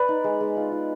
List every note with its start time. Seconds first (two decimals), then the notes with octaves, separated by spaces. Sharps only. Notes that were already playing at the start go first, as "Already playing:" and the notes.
Already playing: B3 B4 D5
0.08 D#4
0.24 G#3
0.41 G#3
0.56 F4
0.72 F4